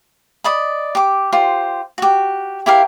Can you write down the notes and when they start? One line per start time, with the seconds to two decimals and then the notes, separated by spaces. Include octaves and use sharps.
0.44 D5 D#5 B5
0.95 G4 D6
1.32 F4 G4 C5
1.98 F#4 G4
2.66 E4 G4 A#4 F5